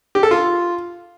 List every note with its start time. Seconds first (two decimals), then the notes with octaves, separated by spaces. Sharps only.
0.15 G4
0.23 A4
0.31 F4